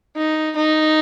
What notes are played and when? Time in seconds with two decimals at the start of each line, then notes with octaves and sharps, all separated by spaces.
0.16 D#4
0.56 D#4